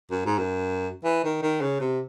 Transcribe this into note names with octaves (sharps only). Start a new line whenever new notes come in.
F#2
G#2
F#2
E3
D#3
D#3
C#3
C3